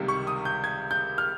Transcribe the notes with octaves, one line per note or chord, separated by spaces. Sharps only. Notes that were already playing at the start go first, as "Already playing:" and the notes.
Already playing: C#2 C3 D#3 G3 A#3
C#6
D#6
G6
G#6
G6
F6